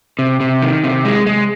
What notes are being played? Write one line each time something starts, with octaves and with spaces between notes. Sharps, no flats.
C3
C3
D#3
C3
G#3
G#3